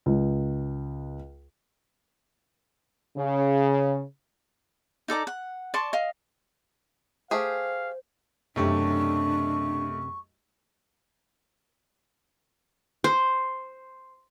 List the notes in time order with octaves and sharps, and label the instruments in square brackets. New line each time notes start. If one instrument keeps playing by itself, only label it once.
[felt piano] C#2
[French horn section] C#3
[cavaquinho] D#4 A4 D5 A#5
F#5
D5 A5 C6 C#6
D#5 F5
[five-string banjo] A3 G4 G#4 [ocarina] C5 [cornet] F5
[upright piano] B1 A3 G4 [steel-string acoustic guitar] F#2 C3 [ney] D4 [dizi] C#6
[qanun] C5